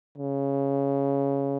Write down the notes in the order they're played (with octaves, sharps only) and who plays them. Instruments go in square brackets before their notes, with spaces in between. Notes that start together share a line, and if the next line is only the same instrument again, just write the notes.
[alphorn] C#3